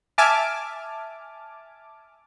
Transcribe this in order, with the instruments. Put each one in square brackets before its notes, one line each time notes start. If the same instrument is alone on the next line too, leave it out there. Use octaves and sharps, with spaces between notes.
[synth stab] E5 G#5 A5 D6 F6